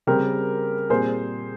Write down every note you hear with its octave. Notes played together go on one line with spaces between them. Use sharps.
C#3 G3 C4 G4 A#4
A#2 G3 C4 G#4 C5